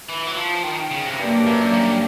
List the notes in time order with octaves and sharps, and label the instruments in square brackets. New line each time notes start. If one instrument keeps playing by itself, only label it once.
[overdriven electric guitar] E3
F#3
F3
D#3
C#3
C3
[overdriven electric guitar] G2 [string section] F#3 A#3 D4 G4
[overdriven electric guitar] F#2
G2